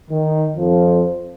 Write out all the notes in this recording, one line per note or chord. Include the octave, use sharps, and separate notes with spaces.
D#3
F2 F3